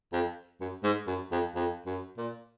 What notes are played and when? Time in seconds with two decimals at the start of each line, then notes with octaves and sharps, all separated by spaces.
0.13 F2
0.61 F#2
0.84 G#2
1.07 F#2
1.32 F2
1.56 F2
1.86 F#2
2.18 A#2